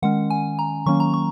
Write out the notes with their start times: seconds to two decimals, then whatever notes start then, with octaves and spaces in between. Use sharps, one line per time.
0.02 D#3 G#3 C#4 F#5
0.30 G#5
0.59 A#5
0.86 D#3 F#3 A#3 C#4 C#6
1.00 A#5
1.14 C#6